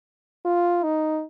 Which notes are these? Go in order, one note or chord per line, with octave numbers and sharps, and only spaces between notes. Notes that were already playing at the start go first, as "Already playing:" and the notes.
F4
D#4